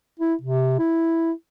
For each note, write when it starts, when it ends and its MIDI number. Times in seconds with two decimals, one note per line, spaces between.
0.19 0.34 64
0.42 0.75 48
0.79 1.31 64